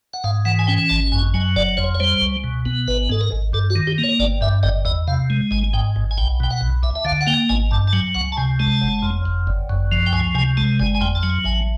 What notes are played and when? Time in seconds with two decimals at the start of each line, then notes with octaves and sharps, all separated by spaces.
0.14 F#5
0.24 G#2 F5
0.45 E3 F#5
0.59 G#5
0.67 C#4 G5
0.89 G#1 A5
1.12 F#2 G#5
1.34 F#3 G#5
1.56 F#1 D5
1.77 F2 C#5
1.95 C#5
2.00 G3 C5
2.21 C#2
2.44 B2
2.66 B3
2.88 G#1 B4
3.09 G#2 A4
3.21 A#4
3.32 G#1
3.53 G2 A4
3.70 F#4
3.76 D#3
3.87 G4
3.98 A#3
4.04 C#5
4.19 G1 D5
4.41 G2 E5
4.63 G1 D#5
4.85 E2 D#5
5.08 C3 F5
5.30 G#3
5.51 G#1 G#5
5.73 G#2 G5
5.96 G#1
6.11 G#5
6.18 B1 G5
6.40 B2 G5
6.51 F#5
6.61 B1
6.83 D2 E5
6.96 E5
7.05 D3 F5
7.21 F#5
7.27 A#3 G5
7.49 G#1 G#5
7.71 G2 A5
7.88 A5
7.93 F#3 G#5
8.15 C#2 F#5
8.32 A5
8.37 C3 G#5
8.60 G#3 A5
8.81 F#1
9.03 F2
9.26 F#1
9.47 G1
9.69 F#2
9.92 F3
10.06 G5
10.13 C#2 G#5
10.35 C3 G#5
10.57 G#3 A5
10.80 G1 G#5
10.95 G#5
11.01 F2 G5
11.15 A5
11.23 F#3 G#5
11.44 A1 G#5